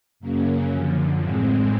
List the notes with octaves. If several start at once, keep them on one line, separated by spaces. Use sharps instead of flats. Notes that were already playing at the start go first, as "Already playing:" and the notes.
F#2 C#3 F#3 A#3 C#4
F#2 D3 F3
A2 E3 G#3 C4